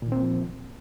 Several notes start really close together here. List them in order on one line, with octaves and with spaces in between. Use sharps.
A#2 D#3 C4 A#3 F3